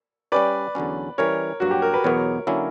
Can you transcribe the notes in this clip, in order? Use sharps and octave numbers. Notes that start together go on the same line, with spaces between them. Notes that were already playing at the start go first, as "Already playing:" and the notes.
G3 C#4 G4 B4 D5
E2 D3 F#3 C#4
E3 G3 C#4 A#4 C#5
G2 F#3 A#3 F#4
G4
A#4
B4
E2 B2 F#3 B3 A#4 C#5
D3 F#3 A#3 C#4 E4